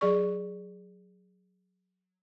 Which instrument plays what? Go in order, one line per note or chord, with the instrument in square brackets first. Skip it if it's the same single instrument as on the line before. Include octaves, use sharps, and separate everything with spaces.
[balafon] F#3 G#4 D5 C#6